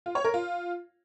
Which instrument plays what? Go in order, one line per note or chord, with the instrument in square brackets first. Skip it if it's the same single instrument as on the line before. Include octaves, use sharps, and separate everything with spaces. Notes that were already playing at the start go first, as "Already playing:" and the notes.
[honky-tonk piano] F4
C#5
A#4
F4